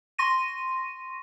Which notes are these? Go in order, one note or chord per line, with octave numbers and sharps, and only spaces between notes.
C6 C#6 A#6 D#7